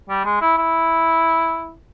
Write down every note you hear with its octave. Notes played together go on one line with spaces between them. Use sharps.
G3
G#3
E4
E4